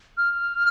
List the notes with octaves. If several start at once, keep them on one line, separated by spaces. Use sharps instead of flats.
F6